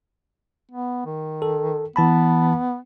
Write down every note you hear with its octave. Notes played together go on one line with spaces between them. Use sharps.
B3
D#3
A4
E3 B3 A5 B5